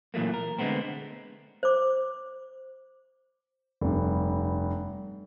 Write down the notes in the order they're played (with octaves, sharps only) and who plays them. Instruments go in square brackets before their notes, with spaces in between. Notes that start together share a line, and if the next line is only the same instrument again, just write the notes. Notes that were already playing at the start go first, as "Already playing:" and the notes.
[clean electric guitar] A#2 E3 F#3 A3 A#3
A#4
D3 G#3 A3 B3 C4
[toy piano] C5 D6
[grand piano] F1 G2